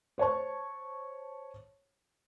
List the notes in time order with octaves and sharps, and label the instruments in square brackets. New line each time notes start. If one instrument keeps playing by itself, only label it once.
[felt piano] C5 C#5 A5 C#6